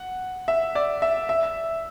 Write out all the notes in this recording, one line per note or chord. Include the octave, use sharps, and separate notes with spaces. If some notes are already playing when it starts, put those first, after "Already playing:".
Already playing: F#5
E5
D5
E5
E5